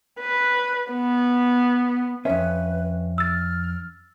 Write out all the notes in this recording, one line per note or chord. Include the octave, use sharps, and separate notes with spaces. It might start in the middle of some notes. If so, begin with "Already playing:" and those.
B4
B3
F2 C#4 B4 E5
E6 F6 A6